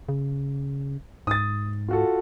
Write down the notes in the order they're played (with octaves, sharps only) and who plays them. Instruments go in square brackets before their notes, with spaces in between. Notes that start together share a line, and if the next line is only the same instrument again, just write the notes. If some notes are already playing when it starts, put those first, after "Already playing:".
[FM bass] C#3
[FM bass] G#2 [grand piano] D#6 A6
[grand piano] F4 F#4 A4